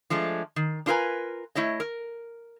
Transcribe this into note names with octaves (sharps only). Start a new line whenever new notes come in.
F3 G#3 A3 D4
D#3
D4 F4 G#4 A#4 B4 G#5
A3 E4 C#5 D#5
A#4